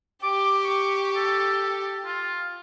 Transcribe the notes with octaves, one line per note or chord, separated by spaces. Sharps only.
G4 D6
C#6
A4
F4